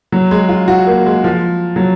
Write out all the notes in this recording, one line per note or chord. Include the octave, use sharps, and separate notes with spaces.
F#3
G#3
F4
F#4
A#3
G#3
F3
F#3